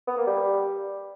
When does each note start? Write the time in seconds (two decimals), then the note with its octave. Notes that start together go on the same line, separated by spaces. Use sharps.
0.08 B3
0.17 A#3
0.27 G3